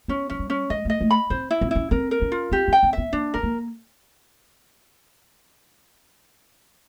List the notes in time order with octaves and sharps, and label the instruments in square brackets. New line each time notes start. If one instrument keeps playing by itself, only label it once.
[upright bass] B3 [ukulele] C#4
[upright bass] F#3 [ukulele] C#4
[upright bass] G3
[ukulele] C#4
[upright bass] G#3 [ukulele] D#5
[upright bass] A3 [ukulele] D#5
[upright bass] A3
[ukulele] B5
[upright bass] C4 [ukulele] C5
[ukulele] E4
[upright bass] C4
[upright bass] C#4 [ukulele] E4
[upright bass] C4 [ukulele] A#4
[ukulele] A#4
[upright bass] C#4
[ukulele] F4
[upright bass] C4 [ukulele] G4
[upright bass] C#4 [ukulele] G5
[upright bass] C4
[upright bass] B3 [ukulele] E5
[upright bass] A#3 [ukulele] D4
[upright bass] B3 [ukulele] A#4
[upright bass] A#3